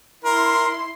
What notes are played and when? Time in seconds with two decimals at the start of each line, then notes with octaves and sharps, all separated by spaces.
0.24 E4 A#4 C6